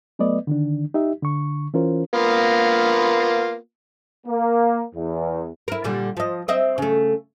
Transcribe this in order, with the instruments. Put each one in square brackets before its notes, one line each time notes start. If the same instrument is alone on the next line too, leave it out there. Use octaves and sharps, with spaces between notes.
[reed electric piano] F#3 A3 B3 B4 D5 D#5
D3 D#3 D4
D#4 G4 E5
D3 C#6
E3 C#4 F4 A#4 C5
[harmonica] A#3 B3 F4
[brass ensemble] A#3
E2
[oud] E4 A#4
A#2 D3 G3
F3 D#5
C4 D#5 E5
C#3 A3